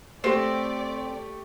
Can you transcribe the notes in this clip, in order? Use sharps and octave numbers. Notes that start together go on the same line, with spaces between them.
A3 C4 G4 D5